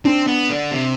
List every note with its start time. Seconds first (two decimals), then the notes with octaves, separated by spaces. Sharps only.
0.05 C4 D4
0.27 B3
0.50 D3
0.72 C3